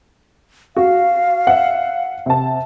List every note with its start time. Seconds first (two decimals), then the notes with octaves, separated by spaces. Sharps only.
0.77 F#4 F5
1.47 E5 F#5
2.26 C3 A5